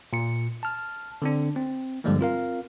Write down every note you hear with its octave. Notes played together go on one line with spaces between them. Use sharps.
A#2 C#7
A5 F6
D3 C4 D4
C4
G2 D3 F3 G3 G#3 A#3
C4 F4 A#4 F5